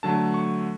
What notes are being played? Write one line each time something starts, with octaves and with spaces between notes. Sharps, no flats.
D3 F#3 A3 A5
C#6